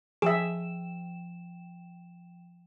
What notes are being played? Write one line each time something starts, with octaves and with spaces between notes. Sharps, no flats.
F3 G#4 E5 G5 E7